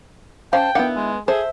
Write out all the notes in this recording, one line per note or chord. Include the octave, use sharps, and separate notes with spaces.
C#4 C5 F5 G5 A5
D#3 B3 D4 E4 F5 F#5
G#3
G#4 A4 C5 E5